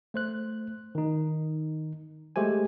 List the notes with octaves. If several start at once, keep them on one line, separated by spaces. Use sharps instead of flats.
A3 C5 F#6
D#3 D#4
G#3 A3 G4 C5 G#5